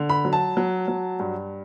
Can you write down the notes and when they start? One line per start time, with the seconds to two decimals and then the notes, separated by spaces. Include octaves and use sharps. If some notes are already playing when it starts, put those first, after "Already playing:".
Already playing: D3
0.10 B5
0.25 F#3
0.33 A5
0.57 F#3
0.88 F#3
1.20 G2